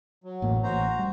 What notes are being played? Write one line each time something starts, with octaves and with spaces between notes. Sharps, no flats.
F#3
A1 A2 A#3
A1 F#4 C5 A#5
G3